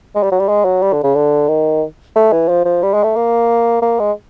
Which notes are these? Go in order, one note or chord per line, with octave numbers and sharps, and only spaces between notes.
G#3
G3
F#3
G3
G#3
F#3
G3
D3
C#3
D3
D#3
A3
E3
F3
F3
G3
G#3
A3
A#3
A#3
G#3